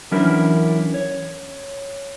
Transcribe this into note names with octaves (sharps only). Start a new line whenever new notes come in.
E3 F#3 C#4 D4 E4 A#4
C#5